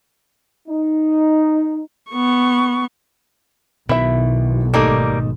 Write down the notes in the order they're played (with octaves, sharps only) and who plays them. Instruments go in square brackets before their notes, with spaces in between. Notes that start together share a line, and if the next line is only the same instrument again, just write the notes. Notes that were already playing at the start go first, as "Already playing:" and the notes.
[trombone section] D#4
[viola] B3 C#6
[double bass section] B1 [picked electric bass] B2 D#3 [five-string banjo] E4 E5
[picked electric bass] G#1 [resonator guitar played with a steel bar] G3 A#3 [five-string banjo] A3 D#4 A4